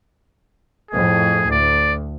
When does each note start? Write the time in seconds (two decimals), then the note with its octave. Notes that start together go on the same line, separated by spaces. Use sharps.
0.91 F2 A2 G#4
1.51 D2 D5